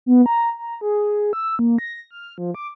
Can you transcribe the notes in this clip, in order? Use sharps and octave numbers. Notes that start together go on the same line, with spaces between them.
B3
A#5
A#5
G#4
E6
A#3
A#6
F6
F3
D6